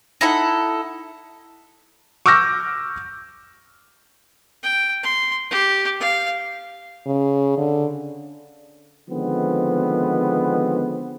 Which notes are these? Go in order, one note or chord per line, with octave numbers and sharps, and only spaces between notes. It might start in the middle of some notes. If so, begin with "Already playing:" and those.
D#4 E4 A4 F#5
C#6 D6 E6 F6 G6 A#6
G5
C6
G4
F5
C#3
D3
D3 D#3 F3 G#3 B3 C4